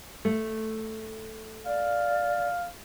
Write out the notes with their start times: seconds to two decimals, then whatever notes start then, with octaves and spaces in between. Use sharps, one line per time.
0.25 A3
1.66 D5 F5